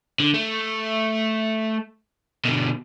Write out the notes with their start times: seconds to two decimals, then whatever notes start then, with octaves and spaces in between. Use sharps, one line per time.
0.20 D3
0.34 A3
2.45 B2 D3